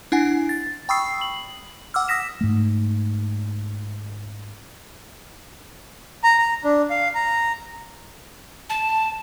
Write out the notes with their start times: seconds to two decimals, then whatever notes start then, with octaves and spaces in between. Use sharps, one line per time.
0.12 D4 E4 F#5 G#5
0.49 A6
0.89 G5 B5 C#6 D#6 E6 C7
1.21 F#7
1.94 F#5 D6 E6 F6
2.08 D#6 E6 A#6 B6 E7
2.41 G#2 A3
6.24 A#5
6.38 A#5
6.64 D4
6.90 F5
7.15 A#5
8.70 A5